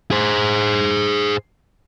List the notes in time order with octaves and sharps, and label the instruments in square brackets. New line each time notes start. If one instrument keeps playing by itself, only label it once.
[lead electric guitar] G#4 C5